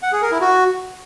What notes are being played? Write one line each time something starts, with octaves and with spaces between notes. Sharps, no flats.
F#5
G#4
A#4
E4
F#4